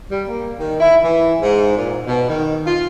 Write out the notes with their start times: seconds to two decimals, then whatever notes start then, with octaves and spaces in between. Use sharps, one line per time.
0.10 G3
0.27 A#3
0.57 D#3
0.80 E4
1.02 E3
1.40 G#2
1.75 A#2
2.07 B2
2.28 D#3
2.65 F4